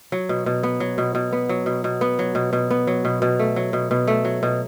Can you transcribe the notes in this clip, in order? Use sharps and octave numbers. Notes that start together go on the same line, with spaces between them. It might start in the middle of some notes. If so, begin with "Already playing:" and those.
F#3
B2
B2
B3
F#3
B2
B2
B3
F#3
B2
B2
B3
F#3
B2
B2
B3
F#3
B2
B2
A3
F#3
B2
B2
A3
F#3
B2